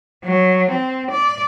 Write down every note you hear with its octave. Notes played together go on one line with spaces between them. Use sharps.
F#3
C4
D5